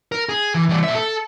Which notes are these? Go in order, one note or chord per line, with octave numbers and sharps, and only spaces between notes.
A#4
G#4
E3
E3 G3
A#2 E5
A4